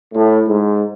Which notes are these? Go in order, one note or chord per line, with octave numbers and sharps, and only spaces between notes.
A2
G#2